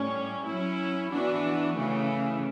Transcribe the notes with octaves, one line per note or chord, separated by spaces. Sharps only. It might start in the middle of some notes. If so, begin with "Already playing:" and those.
Already playing: A2 G3 C#4
F#3 C#4 E4
E3 B3 D4 F#4
C#3 E3 A3